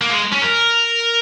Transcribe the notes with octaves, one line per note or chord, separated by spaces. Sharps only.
A#3
G#3
C#4
A#4